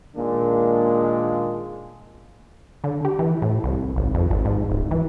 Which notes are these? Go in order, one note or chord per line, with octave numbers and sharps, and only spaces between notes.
A#2 D#3 G#3 A#3 D4
D3
G4
E3
A2
C2
G#1
F2
G#1
G#2
D1
E3